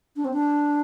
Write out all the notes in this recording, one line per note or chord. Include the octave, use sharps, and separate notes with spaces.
D4
C4
D4